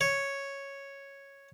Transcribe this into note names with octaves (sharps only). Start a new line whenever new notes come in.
C#5